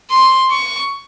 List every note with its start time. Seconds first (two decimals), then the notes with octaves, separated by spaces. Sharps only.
0.10 C6
0.51 C#6